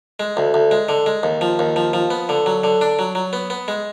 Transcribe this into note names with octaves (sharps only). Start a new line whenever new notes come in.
G#3
D2
D2
G#3
D3
G#3
D#2
F3
D#2
F3
F3
B3
D3
F#3
D3
D4
F#3
F#3
B3
B3
G#3